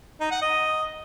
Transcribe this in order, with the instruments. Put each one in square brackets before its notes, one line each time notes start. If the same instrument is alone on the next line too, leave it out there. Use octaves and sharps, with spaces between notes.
[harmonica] D#4
F#5
D#5